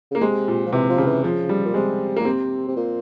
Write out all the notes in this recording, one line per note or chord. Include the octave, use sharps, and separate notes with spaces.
C#3 A#3
C3 G#3
A#2
F3
C3 E3
F3
C#3
E3
C#3 F3
G3
A#2
C3 G#3
A#2 A#3
C3 C4
C3
A#2